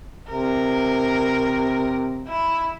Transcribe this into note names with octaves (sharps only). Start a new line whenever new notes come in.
C3 A#4
E4